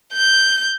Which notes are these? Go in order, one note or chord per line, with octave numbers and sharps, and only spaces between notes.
G6